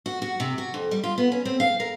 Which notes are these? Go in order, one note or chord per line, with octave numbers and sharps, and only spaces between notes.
F#4
F#4
C3
F#4
F2
G3
F4
B3
C#4
C4
F5
A#4